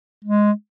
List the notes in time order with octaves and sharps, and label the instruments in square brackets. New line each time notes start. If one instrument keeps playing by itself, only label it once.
[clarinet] G#3